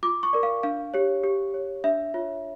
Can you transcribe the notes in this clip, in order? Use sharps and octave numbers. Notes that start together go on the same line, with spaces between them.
F4 D6
C#6
A#4 D5
F5
D4 F5
G4 C#5
G4
C#5
D4 E5
F4 C#5